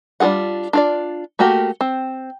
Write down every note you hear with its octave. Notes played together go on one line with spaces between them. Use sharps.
G3 D4 F4 G#4 F#5
D4 F4 D5
A3 A#3 F#4 G4 A#4
C4